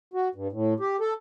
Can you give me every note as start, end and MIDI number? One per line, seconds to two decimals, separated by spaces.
0.14 0.28 66
0.35 0.48 43
0.52 0.74 45
0.80 0.97 67
1.00 1.14 69